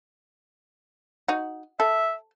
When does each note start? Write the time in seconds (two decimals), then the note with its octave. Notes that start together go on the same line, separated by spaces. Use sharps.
1.28 D#4 F#4
1.80 A4 E5